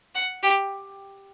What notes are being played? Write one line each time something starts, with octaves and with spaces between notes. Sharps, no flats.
F#5
G4